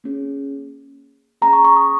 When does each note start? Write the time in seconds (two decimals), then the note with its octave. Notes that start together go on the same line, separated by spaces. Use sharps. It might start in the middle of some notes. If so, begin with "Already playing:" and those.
0.04 A#3 C#4 G#4
1.42 A#3 C#4 G#4 A#5
1.53 C#6
1.65 C#6
1.76 D#6